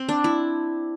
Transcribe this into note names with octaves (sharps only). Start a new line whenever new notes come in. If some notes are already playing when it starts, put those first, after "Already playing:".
Already playing: C4
D4
E4